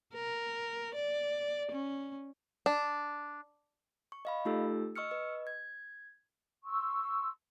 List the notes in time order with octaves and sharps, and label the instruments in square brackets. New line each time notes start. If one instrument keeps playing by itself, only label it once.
[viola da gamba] A#4
D5
C#4
[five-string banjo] D4
[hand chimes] C#6
D#5 F5 B5
A3 D#4 F4 G4 A4 E6
D#5 C#6 E6 F6 C#7
B4 D#5
G#6
[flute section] C6 C#6 E6